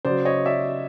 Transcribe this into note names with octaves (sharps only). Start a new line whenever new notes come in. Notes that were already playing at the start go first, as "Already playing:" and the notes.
C#3 F#3 C5 D5
C#5 D#5
D5 E5